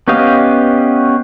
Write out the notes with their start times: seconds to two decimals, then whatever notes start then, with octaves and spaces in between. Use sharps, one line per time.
0.08 B3 C#4 G4 D#5 F5